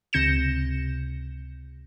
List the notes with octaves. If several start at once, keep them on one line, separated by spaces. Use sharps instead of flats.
C#2 C3 G6 A#6 C#7 E7